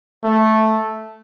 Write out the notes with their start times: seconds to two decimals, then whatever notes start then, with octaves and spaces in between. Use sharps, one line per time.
0.24 A3